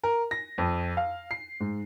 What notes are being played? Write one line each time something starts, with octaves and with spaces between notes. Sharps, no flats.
A#4
A#6
F2
F5
C7
G#2